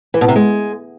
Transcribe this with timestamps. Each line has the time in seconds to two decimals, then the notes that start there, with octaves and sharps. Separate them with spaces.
0.14 E3
0.21 B2
0.28 C3
0.36 G#3